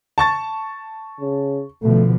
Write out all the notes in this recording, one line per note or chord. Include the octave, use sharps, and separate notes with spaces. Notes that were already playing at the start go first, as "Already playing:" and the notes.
A5 C#6 A6
C#3
B2 D3 F3 A3